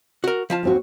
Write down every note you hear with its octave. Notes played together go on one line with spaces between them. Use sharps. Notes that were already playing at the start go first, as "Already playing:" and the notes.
F#4 A#4
F3 F4 A5
D#2 C4 F#4